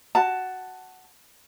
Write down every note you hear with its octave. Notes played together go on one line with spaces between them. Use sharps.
F#4 A5